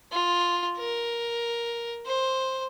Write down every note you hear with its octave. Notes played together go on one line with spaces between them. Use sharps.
F4
A#4
C5